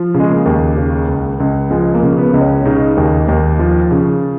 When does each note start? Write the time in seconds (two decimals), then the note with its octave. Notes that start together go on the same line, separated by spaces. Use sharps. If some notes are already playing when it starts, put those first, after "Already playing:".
Already playing: F3
0.14 C#3
0.20 G#3
0.30 A#3
0.45 D#2
0.77 C#3
1.09 C#2
1.40 C#2
1.71 F3 G#3
1.94 A#3
2.02 C#3
2.18 B3
2.33 C#2
2.41 C#4
2.65 C#3 D#4
2.97 D#2
3.28 D#2
3.59 F3
3.91 C#3